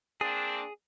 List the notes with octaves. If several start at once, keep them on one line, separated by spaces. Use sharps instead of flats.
A#3 C4 D4 G#4